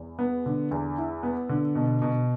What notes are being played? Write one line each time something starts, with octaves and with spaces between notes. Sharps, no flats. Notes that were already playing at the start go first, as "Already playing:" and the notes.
Already playing: E2
B3
D3
E2
E4
B3
D3
B2
B2